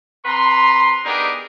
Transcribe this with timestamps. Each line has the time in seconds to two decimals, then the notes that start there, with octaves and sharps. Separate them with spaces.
0.25 C3 B4 A#5 C6
1.05 B3 D4 D#4 G4 G#4 A#4